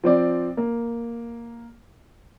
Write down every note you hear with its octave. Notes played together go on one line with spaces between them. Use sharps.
F3 C4 D5
A#3